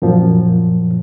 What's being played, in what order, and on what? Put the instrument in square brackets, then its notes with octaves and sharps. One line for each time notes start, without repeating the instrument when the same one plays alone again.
[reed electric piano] F#2 A#2 F3